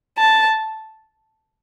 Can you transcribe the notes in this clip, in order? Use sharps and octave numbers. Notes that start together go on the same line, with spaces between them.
A5